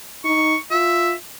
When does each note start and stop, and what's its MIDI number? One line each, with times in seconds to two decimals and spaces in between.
0.25 0.54 63
0.25 0.57 85
0.71 1.14 65
0.71 1.13 76